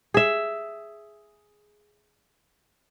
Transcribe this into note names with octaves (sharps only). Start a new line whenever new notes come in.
G#4 E5